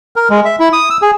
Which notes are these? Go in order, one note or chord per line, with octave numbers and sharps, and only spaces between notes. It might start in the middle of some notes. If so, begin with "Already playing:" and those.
A#4
G#3
E5
E4
D#6
E6
G#4